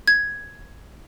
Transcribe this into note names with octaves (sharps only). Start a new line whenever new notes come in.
G#6